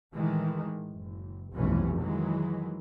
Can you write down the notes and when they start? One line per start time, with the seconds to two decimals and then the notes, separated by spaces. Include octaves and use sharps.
0.14 A2 D#3 E3 G#3
0.90 F#1
1.53 F1 B1 G2 E3 C#4
2.01 D#3 E3 F#3 G#3